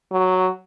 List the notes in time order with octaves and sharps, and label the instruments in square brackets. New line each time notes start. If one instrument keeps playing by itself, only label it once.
[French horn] F#3